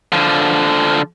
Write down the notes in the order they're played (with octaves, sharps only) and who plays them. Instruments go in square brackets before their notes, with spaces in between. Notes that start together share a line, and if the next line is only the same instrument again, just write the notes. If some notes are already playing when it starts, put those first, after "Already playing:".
[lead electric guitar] D3 F3